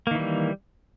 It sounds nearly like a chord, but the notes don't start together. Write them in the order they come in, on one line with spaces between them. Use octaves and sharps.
A#3 D#3 E3 G3